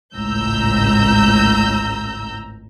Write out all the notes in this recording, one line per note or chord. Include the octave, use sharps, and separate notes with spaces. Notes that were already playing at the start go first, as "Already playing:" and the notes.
G#1 C#2 A2 A#5 E6 G6